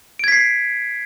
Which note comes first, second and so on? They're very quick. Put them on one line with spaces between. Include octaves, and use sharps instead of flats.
D7 G#6 B6 C7